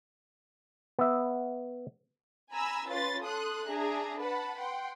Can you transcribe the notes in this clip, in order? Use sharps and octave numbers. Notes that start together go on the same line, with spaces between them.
B3 E5
G#5 A#5 B5 E6
C#4 F4 B4 C6 A6
A4 C6 D#6 F#6
D4 G#4 E5 A#5
B4 F#5 A5 B5
F#5 G5 C6